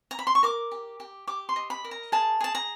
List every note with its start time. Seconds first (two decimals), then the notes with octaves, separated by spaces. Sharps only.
0.11 A#5
0.19 B5
0.27 C6
0.35 C#6
0.43 A#4 D6
0.72 G4
1.00 G4
1.27 G4 D6
1.49 C6
1.56 D#5
1.70 B5
1.84 A#4
1.91 A#5
2.12 G#4 A5
2.40 G#4 A5
2.55 A#5